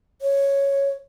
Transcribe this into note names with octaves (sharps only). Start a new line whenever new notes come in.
C#5